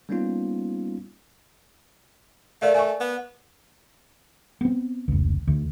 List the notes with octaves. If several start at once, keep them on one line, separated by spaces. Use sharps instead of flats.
G3 A#3 B3 C#4 D#4 F4
A3 A#4 D5 F5
A3 G#5 C#6
B3
B3 C4
F1 C#2
D2